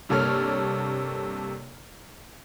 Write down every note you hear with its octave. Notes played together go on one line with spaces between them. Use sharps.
G2 C3 A#3 A4 C#5 F6